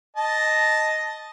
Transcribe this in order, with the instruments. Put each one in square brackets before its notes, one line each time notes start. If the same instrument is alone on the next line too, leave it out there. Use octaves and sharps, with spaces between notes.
[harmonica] D#5 A5